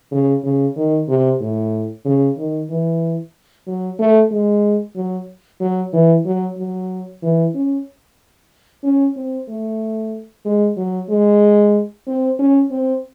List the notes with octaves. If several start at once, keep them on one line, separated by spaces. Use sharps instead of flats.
C#3
C#3
D#3
C3
A2
C#3
D#3
E3
F#3
A3
G#3
F#3
F#3
E3
F#3
F#3
E3
C#4
C#4
C4
A3
G#3
F#3
G#3
C4
C#4
C4